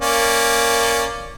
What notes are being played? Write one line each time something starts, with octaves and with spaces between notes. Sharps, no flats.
A#3 C#4 D5